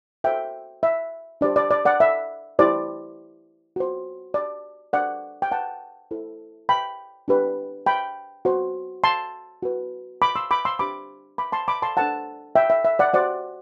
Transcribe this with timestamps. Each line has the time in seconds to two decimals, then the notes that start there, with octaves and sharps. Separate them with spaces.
0.24 F#4 A4 C5 E5 G5
0.83 E5
1.41 D4 G4 C5 D5
1.56 D5
1.71 D5
1.85 D5 F#5
2.00 E5
2.59 E4 G4 C5 D5
3.76 F#4 C5
4.34 D5
4.93 D4 A4 C5 D5 F#5
5.42 G5
5.52 F#5 A5
6.11 E4 A4 C5
6.69 G5 B5
7.28 D4 G4 B4
7.86 G5 B5
8.45 F#4 C5
9.04 A5 C6
9.63 F#4 B4
10.22 B5 D6
10.36 C6 E6
10.51 B5 D6
10.65 C6 E6
10.79 D4 G4 C5 B5 D6
11.38 B5 D6
11.52 A5 C6
11.68 B5 D6
11.82 A5 C6
11.97 D4 A4 C5 F#5 A5
12.56 E5 G5
12.70 E5
12.85 E5
12.99 D5 F#5
13.14 F#4 C5 D5 F#5